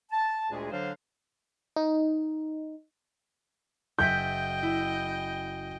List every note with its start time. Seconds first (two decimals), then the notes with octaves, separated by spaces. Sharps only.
0.11 A5
0.51 D2 A#2 G#3 D4 G#4
0.71 D3 F#3 D4 C5 F5
1.76 D#4
3.99 F#1 D#5 E5 G5 G6 B6
4.63 E4